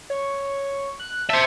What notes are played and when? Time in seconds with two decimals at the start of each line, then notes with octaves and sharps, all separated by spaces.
0.10 C#5
0.99 F#6
1.29 C5 E5 A5